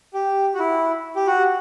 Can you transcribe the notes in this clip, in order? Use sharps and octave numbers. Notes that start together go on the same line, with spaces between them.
G4
F#4
E4
G4
F#4